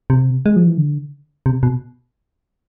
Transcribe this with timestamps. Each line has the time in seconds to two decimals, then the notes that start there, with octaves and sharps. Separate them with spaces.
0.10 C3
0.46 G#3
0.56 F3
0.67 E3
0.78 D3
1.46 C3
1.63 B2